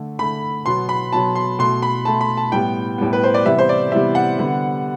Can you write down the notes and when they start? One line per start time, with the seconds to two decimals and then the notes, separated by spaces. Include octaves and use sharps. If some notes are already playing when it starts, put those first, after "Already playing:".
Already playing: D3 A3
0.19 D3 A3 B5
0.66 B2 F#3 B3 C6
0.89 B5
1.12 B2 F#3 B3 A5
1.35 C6
1.59 B2 A3 C6
1.82 B5
2.05 B2 A3 A5
2.21 B5
2.37 A5
2.52 A2 G3 B3 G5
2.98 A2 G3 B3
3.13 B4
3.23 C5
3.34 D5
3.45 C3 E3 G3 B3 E5
3.59 C5
3.69 D5
3.92 C3 E3 G3 B3 E5
4.15 F#5
4.38 D3 G3 B3